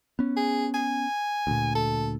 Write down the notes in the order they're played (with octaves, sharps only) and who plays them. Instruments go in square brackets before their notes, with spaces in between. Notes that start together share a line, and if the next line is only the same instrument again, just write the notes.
[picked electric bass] B3 C#4
[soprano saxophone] G#4
G#5
[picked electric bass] D2 A#2
[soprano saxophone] A4